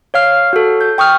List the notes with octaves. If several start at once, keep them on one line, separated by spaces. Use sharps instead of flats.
C#5 F5 F6 C7
F#4 A4
G6
G5 C#6 D#6 F6